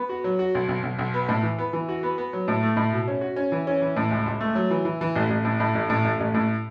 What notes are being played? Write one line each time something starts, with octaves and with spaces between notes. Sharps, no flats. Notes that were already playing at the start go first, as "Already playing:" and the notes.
Already playing: B3
F#4
F#3
F#4
B1
B1
B1
B1
B3
A2
E3
B3
E3
F#4
B3
B3
F#3
A2
A3
A2
B2
C#4
F#4
C#4
E3
C#4
E3
A2
C#2
C#2
A3
F#3
E3
E3
E3
A1
A1
A2
A2
A1
A2
A1
A1
A2